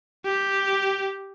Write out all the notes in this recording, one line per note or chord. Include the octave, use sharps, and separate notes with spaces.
G4